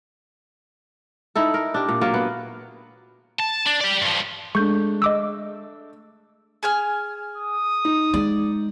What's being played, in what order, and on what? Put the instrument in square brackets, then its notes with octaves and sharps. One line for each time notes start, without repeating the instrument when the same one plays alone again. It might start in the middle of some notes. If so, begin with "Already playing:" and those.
[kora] D#4 E4 A4
A#4
D4 G4
A#2
F#3 A#3 F4
B3
[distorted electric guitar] A5
D4
G4 D5
G2 F3
[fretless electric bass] G#3 [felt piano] A3 D4 [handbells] C#6 G6
[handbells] D#5 D6 E6
[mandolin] G#4 G#5 F6
[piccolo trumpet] D#6
[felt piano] D#4
[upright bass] G#3 [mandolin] D5